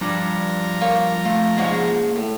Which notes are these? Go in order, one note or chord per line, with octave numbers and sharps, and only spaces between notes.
F3 G3 D4 A#5
A#3 F4 C#5
A3 F4
G#2 C#3 A#3 F#4 G#4
A2